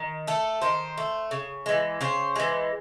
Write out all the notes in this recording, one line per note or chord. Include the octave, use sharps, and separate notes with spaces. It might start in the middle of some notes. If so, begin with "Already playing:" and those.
Already playing: D#3
A3 A4
D#3 C5
A3
C#3
E3 G#3
C#3 C5
E3 G#3